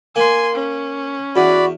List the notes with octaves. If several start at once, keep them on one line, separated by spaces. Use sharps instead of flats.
A#3 G#5 C6
C#4
E2 F#4 D5 B5